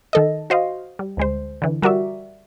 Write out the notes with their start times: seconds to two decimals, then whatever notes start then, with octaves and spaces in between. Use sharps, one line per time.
0.13 D#3 A4 D#5
0.50 F#4 C5 D#5 F5
0.99 G3
1.17 D2 G#3 C5
1.62 D3 E3
1.82 G3 F#4 A#4 D5 E5